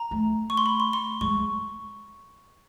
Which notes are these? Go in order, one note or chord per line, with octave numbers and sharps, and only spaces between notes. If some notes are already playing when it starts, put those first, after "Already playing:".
Already playing: A#5
A3
C#6
C6
B5
C6
C6
G#3 C#6